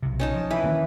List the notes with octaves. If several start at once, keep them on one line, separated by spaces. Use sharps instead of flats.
B1 C3
C#4 D#4 A5
F3
E3 B4
D#3 A#3 C#4